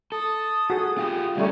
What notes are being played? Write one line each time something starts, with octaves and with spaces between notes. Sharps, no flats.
A4 D#6
F#4 G#4
F4 G4
D2 G3 A3 C#4 G4